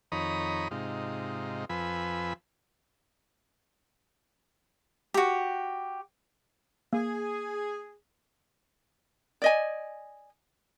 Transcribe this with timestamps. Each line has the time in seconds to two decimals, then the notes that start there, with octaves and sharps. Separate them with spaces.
0.12 F2 D#3 C#5 A#5 B5 D#6
0.71 G#2 C3 D#4 F4
1.69 F2 F3 B4 G#5 B5 E6
5.14 F#4 G4
6.93 A#3 G#4
9.42 D5 D#5 G#5